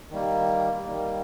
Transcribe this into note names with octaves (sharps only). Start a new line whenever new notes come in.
D#3 G3 A#3
D#3 G3 A#3